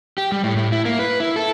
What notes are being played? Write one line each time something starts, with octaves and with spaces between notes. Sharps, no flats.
G4
G3
A2
A2
E4
A#3
B4
E4
A4